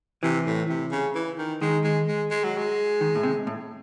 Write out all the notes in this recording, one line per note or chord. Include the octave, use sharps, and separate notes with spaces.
C3 E3
A2
C3
C#3
E3
D#3
D#3 G#3
G#3
G#3
G#3
F#3
G#3
D#3
A2
C3
A2